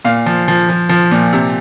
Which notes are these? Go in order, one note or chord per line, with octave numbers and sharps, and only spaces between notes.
A#2 F5
F3
F3
F3
F3
A#2
C3